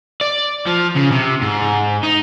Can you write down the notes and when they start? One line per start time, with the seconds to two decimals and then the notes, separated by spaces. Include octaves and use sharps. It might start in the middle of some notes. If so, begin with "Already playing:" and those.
0.21 D5
0.67 F3
0.96 C#3
1.12 C3
1.42 G#2
2.04 D#4